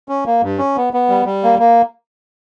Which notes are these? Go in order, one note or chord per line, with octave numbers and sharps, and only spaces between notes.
C#4
A#3
G2
C#4
B3
B3
G3
G3
A#3
A#3